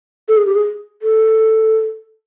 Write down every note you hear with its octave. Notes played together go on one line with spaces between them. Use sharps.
A4
G#4
G4
G#4
A4